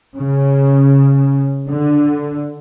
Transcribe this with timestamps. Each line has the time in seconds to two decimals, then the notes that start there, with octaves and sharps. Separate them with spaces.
0.17 C#3
1.69 D3